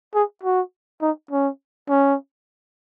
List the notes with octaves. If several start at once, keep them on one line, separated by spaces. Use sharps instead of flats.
G#4
F#4
D#4
C#4
C#4